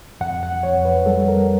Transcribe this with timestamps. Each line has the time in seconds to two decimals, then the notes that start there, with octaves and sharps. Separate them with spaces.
0.21 F2 F#5
0.43 F#5
0.63 F2 C#5
0.85 B4
1.06 G3 A4
1.28 A#4